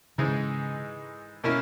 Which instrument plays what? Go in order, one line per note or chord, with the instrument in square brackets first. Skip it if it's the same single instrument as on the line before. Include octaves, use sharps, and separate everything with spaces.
[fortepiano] G#2 E3 G#3 D#4 G#4 [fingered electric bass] C#3
[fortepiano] B2 A#3 C#4 E4 A#4